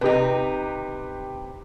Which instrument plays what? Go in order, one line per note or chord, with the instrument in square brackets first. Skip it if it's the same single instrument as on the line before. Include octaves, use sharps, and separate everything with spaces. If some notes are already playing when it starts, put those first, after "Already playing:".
[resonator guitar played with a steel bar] C3 D#4 [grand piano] G4 B4